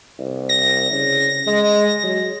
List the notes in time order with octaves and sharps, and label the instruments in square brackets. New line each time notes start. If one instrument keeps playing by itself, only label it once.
[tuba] C2
[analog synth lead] A#6
[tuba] C#3
G#3
F#3